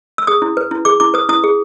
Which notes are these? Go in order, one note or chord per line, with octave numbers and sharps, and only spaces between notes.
E6
G#4 D#6
E4
B4
E4
G#4 D6
E4 D6
B4 D#6
E4 D#6
G#4